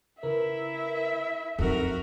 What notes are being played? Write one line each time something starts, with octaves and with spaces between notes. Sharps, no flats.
C#3 E4 A#4 B4 E5
F2 D#4 F#4 A4 A#4